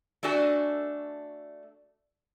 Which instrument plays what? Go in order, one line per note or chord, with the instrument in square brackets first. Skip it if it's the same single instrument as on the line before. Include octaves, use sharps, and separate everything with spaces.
[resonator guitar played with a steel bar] A3 D4 F#4 A4 G#5